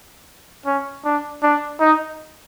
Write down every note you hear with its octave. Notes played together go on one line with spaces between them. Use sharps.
C#4
D4
D4
D#4